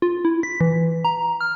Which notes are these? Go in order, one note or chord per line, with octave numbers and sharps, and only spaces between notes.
F4
E4
B6
E3
A#5
F6